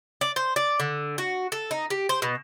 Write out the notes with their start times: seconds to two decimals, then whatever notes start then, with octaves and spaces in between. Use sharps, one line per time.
0.21 D5
0.36 C5
0.56 D5
0.80 D3
1.18 F#4
1.52 A4
1.71 D#4
1.90 G4
2.09 C5
2.22 B2